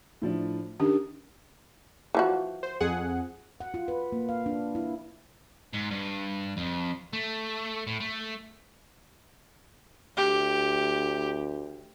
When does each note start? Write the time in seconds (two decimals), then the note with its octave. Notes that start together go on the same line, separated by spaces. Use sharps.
0.22 A2 F3 D4
0.80 D#3 C#4 D4 G4
2.15 E3 F3 F#4
2.63 C5
2.80 F2 G#4 F#5
3.60 F#5
3.74 F4
3.88 B4
4.12 A#3
4.29 F5
4.46 D4
4.75 E4
5.74 G#2
5.91 G2
6.57 F2
7.13 A3
7.87 A2
8.00 A3
10.17 D2 G4